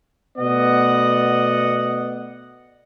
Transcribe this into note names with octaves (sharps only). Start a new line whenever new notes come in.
B2 A3 B3 D5 D#5 F#5